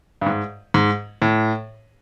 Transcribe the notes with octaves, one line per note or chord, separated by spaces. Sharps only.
G2
G#2
G#2
A2